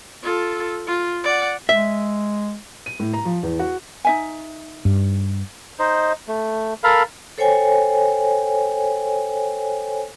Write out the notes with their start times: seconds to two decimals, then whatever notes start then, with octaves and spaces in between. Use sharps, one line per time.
0.23 F4 A4
0.88 F4
1.24 D5 F#5
1.69 G#3 E5
2.86 D#7
2.99 A2
3.13 A#5
3.25 F3
3.43 E2
3.59 F#4
4.05 D#4 E5 G#5
4.85 G2
5.79 D#4 C5 D#5
6.28 A3
6.84 A4 A#4 F5 B5
7.38 A4 C5 C#5 G5 G#5